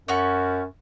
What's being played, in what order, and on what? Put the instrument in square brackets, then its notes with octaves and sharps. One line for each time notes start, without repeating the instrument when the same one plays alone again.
[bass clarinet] F#2 [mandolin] C#4 F#4